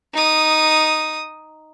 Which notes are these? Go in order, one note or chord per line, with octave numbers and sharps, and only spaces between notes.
D#4 D#6